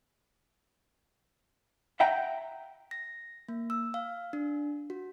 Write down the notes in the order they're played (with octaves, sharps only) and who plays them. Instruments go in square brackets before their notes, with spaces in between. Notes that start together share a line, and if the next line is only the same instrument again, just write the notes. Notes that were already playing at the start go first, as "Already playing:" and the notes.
[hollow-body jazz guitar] E5 F#5 G5 A#5
[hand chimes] A#6
A#3
E6
F5
D4
F#4